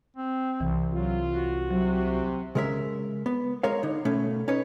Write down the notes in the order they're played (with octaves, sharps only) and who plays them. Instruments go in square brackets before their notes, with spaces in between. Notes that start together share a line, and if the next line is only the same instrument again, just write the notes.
[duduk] C4
[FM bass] C2 [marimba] E3
[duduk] F#3 [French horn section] F4
[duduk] F#4
[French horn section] C3 [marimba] F#3
[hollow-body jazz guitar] C#3 G#3 A#4 C5 E5
B3
G#3 A#4 C#5 F5
D3 D#4
B2 A3 C#4
C#4 D#4 B4 C#5